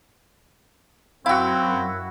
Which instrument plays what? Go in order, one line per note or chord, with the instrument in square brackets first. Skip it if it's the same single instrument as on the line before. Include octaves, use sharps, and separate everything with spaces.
[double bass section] F#2 [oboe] C4 [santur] E4 F#4 [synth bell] F5 G5